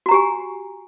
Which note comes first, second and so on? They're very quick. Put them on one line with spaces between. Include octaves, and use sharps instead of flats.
F#4 A#5 G4 G#5